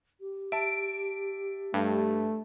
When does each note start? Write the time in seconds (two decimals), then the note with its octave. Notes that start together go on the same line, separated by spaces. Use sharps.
0.20 G4
0.52 E5 A5 D7
1.74 G2 A3